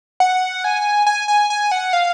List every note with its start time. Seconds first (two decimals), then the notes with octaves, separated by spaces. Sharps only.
0.20 F#5
0.64 G#5
1.07 G#5
1.28 G#5
1.50 G#5
1.72 F#5
1.93 F5